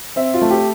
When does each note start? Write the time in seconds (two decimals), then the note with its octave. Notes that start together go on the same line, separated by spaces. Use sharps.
0.16 C4 E5
0.34 F4
0.42 A3
0.51 G4